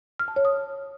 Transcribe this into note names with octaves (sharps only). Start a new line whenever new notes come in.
F6
A5
C#5
D#6